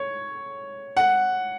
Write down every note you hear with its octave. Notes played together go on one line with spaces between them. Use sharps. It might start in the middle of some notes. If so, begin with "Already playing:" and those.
Already playing: C#5
F#5